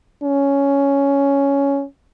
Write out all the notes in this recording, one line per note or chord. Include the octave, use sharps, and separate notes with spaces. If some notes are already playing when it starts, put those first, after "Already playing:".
C#4